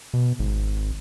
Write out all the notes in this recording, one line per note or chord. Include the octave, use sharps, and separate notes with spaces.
B2
G#1